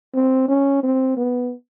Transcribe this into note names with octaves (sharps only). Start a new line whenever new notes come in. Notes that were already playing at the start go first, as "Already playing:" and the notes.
C4
C#4
C4
B3